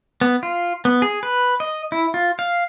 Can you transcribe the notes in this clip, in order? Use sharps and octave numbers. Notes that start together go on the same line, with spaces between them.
B3
F4
B3
G#4
B4
D#5
E4
F4
F5